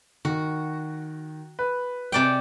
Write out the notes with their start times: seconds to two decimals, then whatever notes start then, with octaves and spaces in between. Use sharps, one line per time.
0.25 D#3 F#4
1.59 B4
2.12 C3 D5 G5